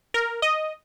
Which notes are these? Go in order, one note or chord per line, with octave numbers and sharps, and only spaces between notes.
A#4
D#5